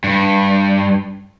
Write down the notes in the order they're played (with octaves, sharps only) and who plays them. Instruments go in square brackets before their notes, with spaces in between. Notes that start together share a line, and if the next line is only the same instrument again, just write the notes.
[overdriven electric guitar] G2